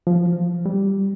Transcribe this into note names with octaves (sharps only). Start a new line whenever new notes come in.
F3
F3
G3